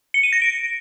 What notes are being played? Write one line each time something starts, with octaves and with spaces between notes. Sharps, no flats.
C#7
D#7
A#6
D7